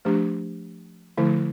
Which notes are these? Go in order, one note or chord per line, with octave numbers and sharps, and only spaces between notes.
F3 A3 D4 G4
D3 F3 A3 E4